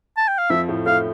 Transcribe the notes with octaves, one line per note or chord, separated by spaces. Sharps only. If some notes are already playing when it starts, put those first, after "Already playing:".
A5
G5
F5
F2 F3 E5
A2 A3
A2 A3 F5